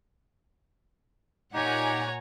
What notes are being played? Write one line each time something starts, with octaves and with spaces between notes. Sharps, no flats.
A#2 D#4 G4 C#5 F#5 G#5 A#5